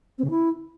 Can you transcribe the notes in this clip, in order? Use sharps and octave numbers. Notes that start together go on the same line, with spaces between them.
C4
C#3
E4